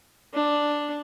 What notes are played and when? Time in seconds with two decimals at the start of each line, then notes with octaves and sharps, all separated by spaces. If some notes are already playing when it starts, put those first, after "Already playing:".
0.34 D4